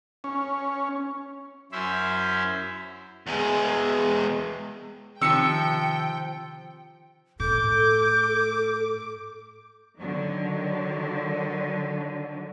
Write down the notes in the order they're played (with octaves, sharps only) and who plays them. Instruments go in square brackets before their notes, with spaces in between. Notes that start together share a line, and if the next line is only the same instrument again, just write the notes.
[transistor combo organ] C#4
[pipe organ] F#2 C#4 E4 C5 E5
[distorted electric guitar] E2 G#3
[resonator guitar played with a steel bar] C3 F3 [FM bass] D#3 [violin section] G5 [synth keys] E6 C#7
[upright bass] A2 [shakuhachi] A4 [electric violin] D6 [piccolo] G6
[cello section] D3 D#3 F#3